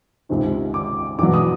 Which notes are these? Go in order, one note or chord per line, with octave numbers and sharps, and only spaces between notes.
C#2 C3 D#3
D6
E2 B2 F#3 D6
D#6